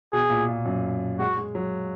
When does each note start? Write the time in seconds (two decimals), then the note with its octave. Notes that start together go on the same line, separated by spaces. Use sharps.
0.13 B2 G#4
0.30 A#2
0.48 A#2
0.65 F#2
1.19 G#3 F#4
1.37 G#3
1.55 F#3